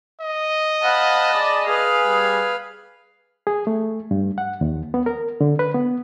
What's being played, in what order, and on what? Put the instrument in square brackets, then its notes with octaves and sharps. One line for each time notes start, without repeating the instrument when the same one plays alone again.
[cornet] D#5
[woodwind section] C5 F5 F#5 [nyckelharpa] A5 B5
[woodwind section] G#4 D5
[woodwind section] G#4 [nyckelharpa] B4 F5
[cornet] G3
[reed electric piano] G#4
A3
G2
F#5
D#2
B3
A#4
D3
B4
B3